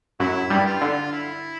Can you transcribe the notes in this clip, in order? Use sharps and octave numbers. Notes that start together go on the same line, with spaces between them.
F#2 F#3 E4
G2 G3
F4
D3
E4